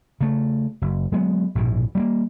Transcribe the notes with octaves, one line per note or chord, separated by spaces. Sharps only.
C#3 A3
F#1
F#3 G#3 B3
A#1 G#2 B2
G3 A3 A#3